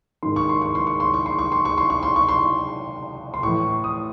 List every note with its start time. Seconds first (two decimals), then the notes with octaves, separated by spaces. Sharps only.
0.23 G#2 D#3 C6
0.36 C#6
0.49 C6
0.61 C#6
0.75 C6
0.87 C#6
1.00 C6
1.14 C#6
1.26 C6
1.39 C#6
1.52 C6
1.65 C#6
1.78 C6
1.90 C#6
2.03 C6
2.16 C#6
2.29 C6
3.34 C6
3.43 A2 C#6
3.48 E3
3.84 D#6